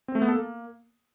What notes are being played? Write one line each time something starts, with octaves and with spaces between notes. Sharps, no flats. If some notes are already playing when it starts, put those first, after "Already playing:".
C4
A3
B3
A4
A#3